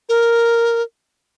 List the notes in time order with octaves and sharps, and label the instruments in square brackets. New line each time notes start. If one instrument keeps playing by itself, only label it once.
[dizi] A#4